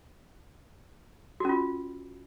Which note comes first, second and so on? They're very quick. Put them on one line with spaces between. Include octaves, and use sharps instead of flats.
F#4 C#4 F4